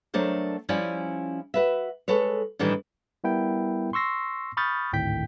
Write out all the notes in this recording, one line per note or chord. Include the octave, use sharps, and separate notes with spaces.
F#3 A3 D4 A#4 C5
F3 G3 C#4 E4 D5 G#5
F#4 B4 E5
G#3 A4 B4 C#5
A2 D#3 E3 G3 D4 D#4
G3 B3 E4 A#4 G5
C6 C#6 E6 A#6 C7
B5 C#6 D#6 F6 G6 A6
G#1 D2 A2 G5 G6 B6